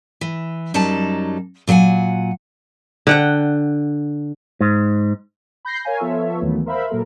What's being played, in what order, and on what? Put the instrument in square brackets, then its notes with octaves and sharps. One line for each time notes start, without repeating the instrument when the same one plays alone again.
[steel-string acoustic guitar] E3
F#2 F#3 G3 D#4 A5
A#2 F#3 G#4 F#5 G#5
[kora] D3 F#5 G5
[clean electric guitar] G#2
[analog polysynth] B5 G6 A#6 C7
A#4 C#5 F5 G#5
F3 B3 F4 A4 C#5 E5
D#2 D#3 E3 F#3 A3 B3
A#4 C5 E5 F5 B5
A#2 F#3 A#3 A4 A#4